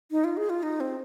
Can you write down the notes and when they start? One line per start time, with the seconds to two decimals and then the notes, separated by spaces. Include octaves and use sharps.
0.11 D#4
0.24 F4
0.37 G#4
0.50 F4
0.63 D#4
0.80 C4